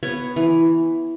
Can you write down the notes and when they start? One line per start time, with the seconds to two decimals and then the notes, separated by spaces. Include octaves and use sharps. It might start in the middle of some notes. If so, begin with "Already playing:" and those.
0.03 B3 C#5
0.36 E3